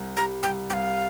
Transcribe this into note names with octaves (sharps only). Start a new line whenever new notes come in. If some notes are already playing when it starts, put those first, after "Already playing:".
Already playing: C2
G3 A#5
C2 G5
C2 F5 G5